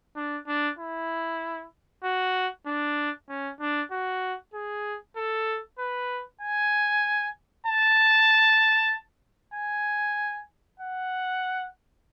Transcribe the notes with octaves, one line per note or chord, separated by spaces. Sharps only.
D4
D4
E4
F#4
D4
C#4
D4
F#4
G#4
A4
B4
G#5
A5
G#5
F#5